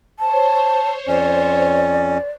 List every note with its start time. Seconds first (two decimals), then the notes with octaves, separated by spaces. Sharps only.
0.19 C5 C#5 A5
1.08 F2 C#4 D5